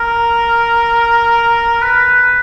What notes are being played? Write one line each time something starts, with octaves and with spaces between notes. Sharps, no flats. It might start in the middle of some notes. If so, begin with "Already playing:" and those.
Already playing: A#4
B4